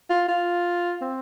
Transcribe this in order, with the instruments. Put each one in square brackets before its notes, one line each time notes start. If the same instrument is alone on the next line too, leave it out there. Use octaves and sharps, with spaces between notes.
[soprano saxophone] F4
F4
C4